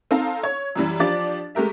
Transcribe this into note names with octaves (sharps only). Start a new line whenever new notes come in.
C4 D#4 A4 F5 A#5
C#5 G#6
F#2 E3 G3
F3 D4 G4 D5 D6 A6
G#3 A3 G4 A#4 E5